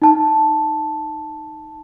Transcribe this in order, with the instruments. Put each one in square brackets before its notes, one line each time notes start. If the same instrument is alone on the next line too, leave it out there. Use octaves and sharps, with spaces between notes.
[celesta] D#4 A5